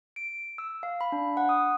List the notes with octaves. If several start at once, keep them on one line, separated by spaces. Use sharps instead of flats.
D7
E6
F5
B5
D4
F#5
D#6